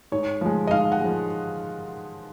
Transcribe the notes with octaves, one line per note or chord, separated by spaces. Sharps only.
G#2 C#5
F3 G#3
D#5
G#2 F5
F#5
F3 G#3